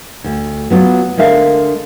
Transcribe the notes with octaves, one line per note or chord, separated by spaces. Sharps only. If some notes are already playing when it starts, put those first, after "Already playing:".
D2
F#3 B3 F4
D3 G#3 A#4 E5 F5